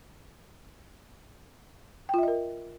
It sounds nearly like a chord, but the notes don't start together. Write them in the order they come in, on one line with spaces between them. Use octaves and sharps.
G5 F4 E5 D#5 A#4